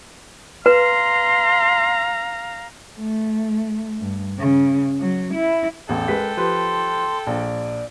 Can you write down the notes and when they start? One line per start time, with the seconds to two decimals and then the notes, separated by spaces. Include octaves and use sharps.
0.66 B4 F5 A#5 C6
2.98 A3
4.00 G2
4.39 C#3
5.00 F#3
5.34 E4
5.89 A1 E2 A4 G5
6.08 G#3 A#4 B4 B6
6.37 F3 G4 B4 C6
7.27 A#1 D5